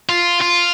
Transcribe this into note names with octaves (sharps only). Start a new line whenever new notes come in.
F4
F4